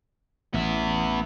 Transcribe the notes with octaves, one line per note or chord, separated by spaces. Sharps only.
A1 B3 E5